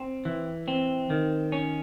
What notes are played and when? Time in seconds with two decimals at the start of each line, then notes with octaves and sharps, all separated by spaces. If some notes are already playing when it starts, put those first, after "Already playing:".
Already playing: C4
0.25 E3
0.68 C4
1.10 D#3
1.52 C#4